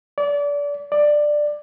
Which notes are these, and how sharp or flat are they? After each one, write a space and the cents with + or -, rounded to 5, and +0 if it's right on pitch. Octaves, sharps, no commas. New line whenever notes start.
D5 -30
D5 +10